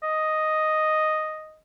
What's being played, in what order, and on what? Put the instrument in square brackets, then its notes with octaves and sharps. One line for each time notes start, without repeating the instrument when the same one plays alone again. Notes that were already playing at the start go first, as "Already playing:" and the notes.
[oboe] D#5